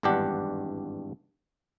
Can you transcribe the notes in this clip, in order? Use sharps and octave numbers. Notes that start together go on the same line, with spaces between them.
G#1 E2 G2 D4 G4 F#5